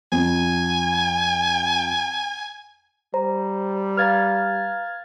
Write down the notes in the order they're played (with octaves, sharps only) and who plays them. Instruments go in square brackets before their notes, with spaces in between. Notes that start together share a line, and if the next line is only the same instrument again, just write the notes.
[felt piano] F2 [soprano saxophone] G#5
[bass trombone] G3 [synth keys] C5 [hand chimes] A#5
[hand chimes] B4 F5 A#5 [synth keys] F6 G#6 A6